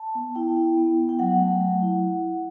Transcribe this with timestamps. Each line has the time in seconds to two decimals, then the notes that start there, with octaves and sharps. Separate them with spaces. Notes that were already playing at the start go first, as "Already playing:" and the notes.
Already playing: A5
0.15 B3
0.35 E4 G5
0.57 E4
0.77 B3
0.98 B3
1.09 G5
1.19 F#3 F#5
1.40 A3
1.61 F#3
1.82 E4